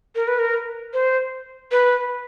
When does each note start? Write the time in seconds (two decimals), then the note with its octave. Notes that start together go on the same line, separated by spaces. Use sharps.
0.15 A#4
0.28 B4
0.39 A#4
0.93 C5
1.71 B4